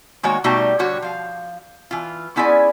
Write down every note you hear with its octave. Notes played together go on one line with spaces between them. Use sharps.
D#3 G#3 A#3 F#4 C#5
B2 G3 A3 D#4 F#4 G4
D3 G3 F#4 C#5
F3 F5
E3 F4
B3 C#4 E4 F4 G#4 D5